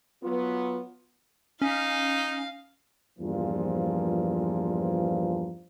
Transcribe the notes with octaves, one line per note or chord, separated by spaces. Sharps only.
F#3 B3 F4
C#4 D#4 F5
E2 G2 A#2 F3